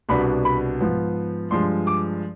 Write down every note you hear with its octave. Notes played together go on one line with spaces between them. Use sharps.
C2 B2 B3 D4 B5
B5
G#2 F3 B3
G2 F3 G#3 C6
D6